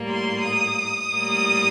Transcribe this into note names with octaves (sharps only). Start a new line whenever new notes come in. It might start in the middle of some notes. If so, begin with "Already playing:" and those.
Already playing: A2 G3 A#3
C6
D#6
A2 G3 A#3